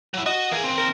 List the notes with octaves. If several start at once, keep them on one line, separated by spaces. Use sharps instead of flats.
F#3 E4
F#4 D#5
E3 A#3 G#4
D#2 C4
A#4